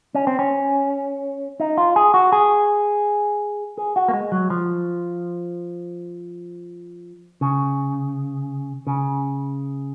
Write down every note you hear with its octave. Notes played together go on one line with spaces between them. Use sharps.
C#4
C4
C#4
D#4
F4
G#4
F#4
G#4
G#4
F#4
A#3
G#3
F#3
F3
C#3
C#3